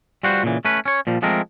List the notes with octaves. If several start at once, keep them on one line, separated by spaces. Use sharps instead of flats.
G3 F4 F#4 B4 C5
A#2 C#3 E3
A3 C#4 B4
C#4 C#5
A#2 F3 G3
F3 G#3 A3 C4 A#4